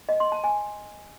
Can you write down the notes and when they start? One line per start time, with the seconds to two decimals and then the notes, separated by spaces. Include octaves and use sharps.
0.09 D#5
0.20 C6
0.32 A5
0.44 G#5